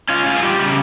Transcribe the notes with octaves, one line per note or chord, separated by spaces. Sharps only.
C#4 F4
F4
G#4
G3 G4
C#3